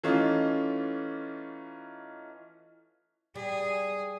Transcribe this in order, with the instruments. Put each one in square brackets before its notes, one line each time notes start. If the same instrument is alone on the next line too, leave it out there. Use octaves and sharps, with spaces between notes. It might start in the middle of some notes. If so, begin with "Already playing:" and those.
[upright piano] E3 A3 C#4 D#4 F4
[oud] G3 [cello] G#4